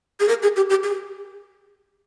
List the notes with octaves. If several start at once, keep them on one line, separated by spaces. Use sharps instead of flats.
G#4
A#4
G#4
G4
G4
G#4